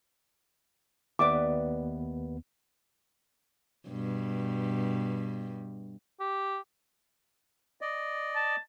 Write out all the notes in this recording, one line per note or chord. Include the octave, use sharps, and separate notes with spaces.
D#2 B3 B4 D5 E5 D6
G2 B2
G4
D5 D#5
A5